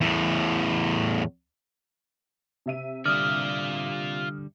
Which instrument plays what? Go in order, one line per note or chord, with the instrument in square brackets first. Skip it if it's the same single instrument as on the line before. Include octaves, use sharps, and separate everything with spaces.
[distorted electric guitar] E2 A2
[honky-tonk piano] C3 E5 D#7
[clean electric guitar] D3 G3 [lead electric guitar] F4 D5 [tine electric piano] D#6 F6